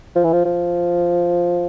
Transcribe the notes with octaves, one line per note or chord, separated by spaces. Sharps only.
F3
E3
F3
F3